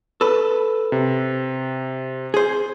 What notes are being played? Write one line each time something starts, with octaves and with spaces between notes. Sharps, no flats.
A4 B4
C3
G#4 C5